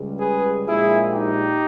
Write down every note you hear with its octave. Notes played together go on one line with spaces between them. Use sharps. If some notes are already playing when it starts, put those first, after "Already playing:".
Already playing: C#2 C#3 G3
G#4 B4
A#1 A#2 G#3 E4 G#4
D#4 G4